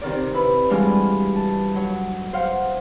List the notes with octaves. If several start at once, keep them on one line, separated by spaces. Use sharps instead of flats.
C3 D#3 D5
E4 B4
E3 G3 G#3 D4 F4 F#4
A5
F#3
C5 F5 F#5